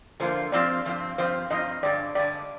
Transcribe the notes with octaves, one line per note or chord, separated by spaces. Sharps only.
D3 F3 A#3 F4 C5
G2 F3 C4 F4 D5
G2 F3 C4 F4
G2 F3 C4 F4 C5
G2 F3 C4 F4 D#5
G2 D3 G#3 D5
G2 D3 G#3 D5